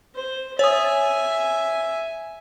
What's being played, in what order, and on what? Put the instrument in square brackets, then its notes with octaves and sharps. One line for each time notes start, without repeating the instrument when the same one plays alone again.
[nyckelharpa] C5
[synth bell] C#5 D#6 [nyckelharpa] E5 G#5